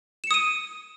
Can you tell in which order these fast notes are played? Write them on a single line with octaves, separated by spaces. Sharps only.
E7 C#7 D#6 D#7